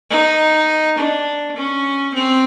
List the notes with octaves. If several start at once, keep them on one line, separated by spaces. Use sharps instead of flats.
D#4
D4
C#4
C4